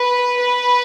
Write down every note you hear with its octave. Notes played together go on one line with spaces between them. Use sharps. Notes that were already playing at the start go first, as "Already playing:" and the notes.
Already playing: B4
B4